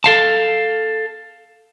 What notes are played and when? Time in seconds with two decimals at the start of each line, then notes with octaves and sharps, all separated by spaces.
0.04 A4 F5 A5